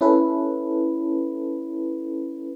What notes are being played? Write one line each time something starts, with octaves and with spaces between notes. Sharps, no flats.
C#4 E4 A4 B4